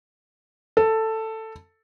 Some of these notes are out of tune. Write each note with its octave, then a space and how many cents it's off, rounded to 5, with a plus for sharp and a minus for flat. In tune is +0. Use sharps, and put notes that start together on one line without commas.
A4 +10